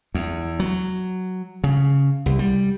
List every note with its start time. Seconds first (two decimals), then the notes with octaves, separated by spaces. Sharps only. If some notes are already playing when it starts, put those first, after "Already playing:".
0.15 E2
0.60 F#3
1.64 C#3
2.26 C2
2.39 G3